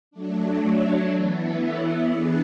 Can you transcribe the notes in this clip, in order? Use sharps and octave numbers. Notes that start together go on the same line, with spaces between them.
F#3 A3 D4
A4 C#5
E3 B3 E4
A4 C#5
E3 B3 D4 G#4 B4